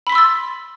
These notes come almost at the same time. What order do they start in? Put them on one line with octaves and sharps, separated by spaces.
B5 B6 C6 E6 A6